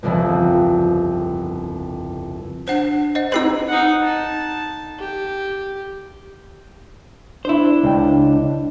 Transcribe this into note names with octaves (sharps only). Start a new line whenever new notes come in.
G1 C2 F2 C#3 F3
D4 C5 F#5
C5 D#5 F#5
C4 D#4 G4 B4 E6 C7 F#7
D#4 F#5
A5
G4
D4 E4 C5
C#2 G5